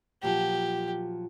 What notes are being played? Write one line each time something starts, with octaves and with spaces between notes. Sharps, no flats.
A#2 F3 F#3 G4